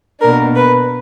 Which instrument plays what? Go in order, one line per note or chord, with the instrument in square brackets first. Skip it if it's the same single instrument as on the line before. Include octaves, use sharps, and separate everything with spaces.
[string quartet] B2 A#3 D4 A#4
B4